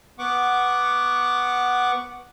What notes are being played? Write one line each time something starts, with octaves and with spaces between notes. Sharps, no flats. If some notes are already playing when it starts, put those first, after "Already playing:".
B3 F#5 C#6 D6